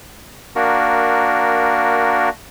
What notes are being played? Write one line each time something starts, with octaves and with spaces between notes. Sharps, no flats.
A#3 D4 F#4 A#4